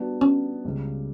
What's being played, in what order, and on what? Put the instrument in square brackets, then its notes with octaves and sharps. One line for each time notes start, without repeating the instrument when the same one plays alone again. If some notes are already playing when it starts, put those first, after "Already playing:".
Already playing: [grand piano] G3 B3 D4 F#4
[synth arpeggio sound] C#4
[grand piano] C#2 C#3 G3